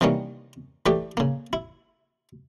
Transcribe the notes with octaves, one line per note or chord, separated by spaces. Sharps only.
C3 D#3 E3 G3 A#3 C#4
E3 A3 G4 A4 D5
C#3 A#3
E4